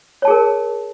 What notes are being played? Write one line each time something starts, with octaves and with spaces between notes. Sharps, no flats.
G#4 A#4 C#5 A5